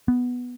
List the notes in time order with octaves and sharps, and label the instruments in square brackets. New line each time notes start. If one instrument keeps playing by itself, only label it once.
[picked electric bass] B3